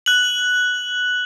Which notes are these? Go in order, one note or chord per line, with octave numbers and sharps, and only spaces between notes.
F#6 F#7